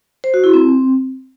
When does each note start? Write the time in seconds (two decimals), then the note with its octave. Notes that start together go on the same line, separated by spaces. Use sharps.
0.24 C5
0.34 F#4
0.44 E4
0.54 C4